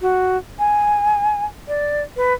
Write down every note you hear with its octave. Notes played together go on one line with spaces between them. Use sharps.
F#4
G#5
D5
B4